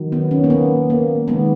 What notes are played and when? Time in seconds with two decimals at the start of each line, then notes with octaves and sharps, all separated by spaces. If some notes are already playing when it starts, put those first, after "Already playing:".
Already playing: D#3 F#3
0.12 B3
0.31 C#4
0.44 A#3
0.50 B3
0.90 A#3
1.28 D#3 G#3 B3